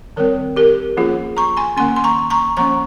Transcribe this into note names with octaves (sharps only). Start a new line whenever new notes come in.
D#3 G3 C4 A#4 C#5
G4 A#4
F3 A#3 C#4 F4 G#4
A#5 C#6
G#5 C6
D#3 A#3 C#4 G#5 C6
C6
A#5 C#6
A#5 C#6
F3 A#3 C#4 A#5 C#6